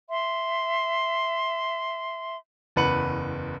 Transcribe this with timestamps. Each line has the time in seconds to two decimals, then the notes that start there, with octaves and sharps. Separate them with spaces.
0.10 E5 C6
2.76 F#1 E2 B4 C#7 F#7